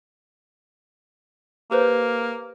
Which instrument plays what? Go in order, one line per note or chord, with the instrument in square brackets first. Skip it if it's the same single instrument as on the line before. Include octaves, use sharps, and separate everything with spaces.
[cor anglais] A#3 [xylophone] G4 B4 C5